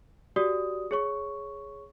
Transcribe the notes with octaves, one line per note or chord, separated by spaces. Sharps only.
F#4 G4 D5 D#6
G#4 C#5 C#6